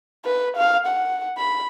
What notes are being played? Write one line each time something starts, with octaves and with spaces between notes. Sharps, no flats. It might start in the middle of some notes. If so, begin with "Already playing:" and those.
B4
F5
F#5
B5